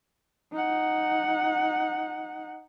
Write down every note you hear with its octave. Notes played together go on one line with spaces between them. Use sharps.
D#4 F#5